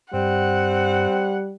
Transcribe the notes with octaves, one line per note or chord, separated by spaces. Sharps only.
G2 G3 C4 F#5